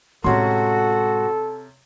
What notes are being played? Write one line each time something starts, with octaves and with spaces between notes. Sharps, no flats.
A2 C3 G#3 C#4 F#4 A4 C6